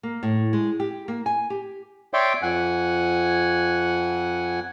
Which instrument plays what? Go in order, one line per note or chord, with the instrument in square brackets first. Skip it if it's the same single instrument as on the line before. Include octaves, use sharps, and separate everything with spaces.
[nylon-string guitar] A#3
A2
G#3
G4
A#3
G#5
G4
[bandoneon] C#5 D5 E5 G5 C6 D6
F2 F#5 G#5